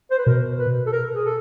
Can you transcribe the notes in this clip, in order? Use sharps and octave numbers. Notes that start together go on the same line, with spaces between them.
C5
B4
B2 A#4
B4
A4
A#4
G#4
A4